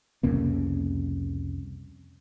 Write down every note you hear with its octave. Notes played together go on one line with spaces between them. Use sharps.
C2 F2 C#3 A#3